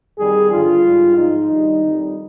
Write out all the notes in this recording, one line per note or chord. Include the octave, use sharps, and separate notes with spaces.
F2 D#3 G3 G#4
G2 D3 F3 F4
G#2 G3
G#2 F3 D#4
G2 D#3 G3
F2 D#3 G3